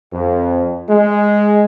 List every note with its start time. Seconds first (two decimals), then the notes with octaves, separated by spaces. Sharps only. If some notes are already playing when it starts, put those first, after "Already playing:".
0.13 F2
0.89 G#3